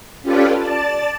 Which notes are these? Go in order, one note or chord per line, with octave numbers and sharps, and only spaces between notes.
C#4 F4 G4 A4 B4 D5
D5 A5 A6